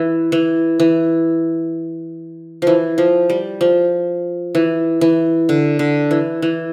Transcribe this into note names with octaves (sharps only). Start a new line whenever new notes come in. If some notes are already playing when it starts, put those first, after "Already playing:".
Already playing: E3
E3
E3
E3 F3
F3
G3
F3
E3
E3
D3
D3
E3
E3